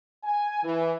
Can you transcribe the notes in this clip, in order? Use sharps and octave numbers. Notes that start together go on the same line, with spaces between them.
G#5
E3